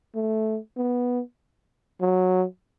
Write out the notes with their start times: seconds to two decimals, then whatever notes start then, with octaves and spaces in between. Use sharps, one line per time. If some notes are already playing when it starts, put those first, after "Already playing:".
0.15 A3
0.77 B3
2.01 F#3